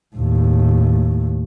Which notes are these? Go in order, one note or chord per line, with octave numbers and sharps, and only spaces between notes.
D#2 A2